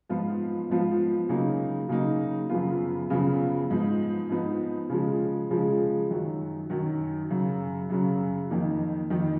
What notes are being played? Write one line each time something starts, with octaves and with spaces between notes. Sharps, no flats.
G#2 F3 B3 F4
G#2 F3 B3 F4
C#3 F#3 A#3 D#4
C#3 F#3 A#3 D#4
F#2 C#3 F3 B3 F4
F#2 C#3 F3 B3 F4
G#2 F3 B3 D#4
G#2 F3 B3 D#4
C#3 F3 G#3
C#3 F3 G#3
F#2 D#3 F#3
F#2 D#3 F#3
F#2 C#3 F#3
F#2 C#3 F#3
F2 D#3 A#3 D#4
F2 D#3 A#3 D#4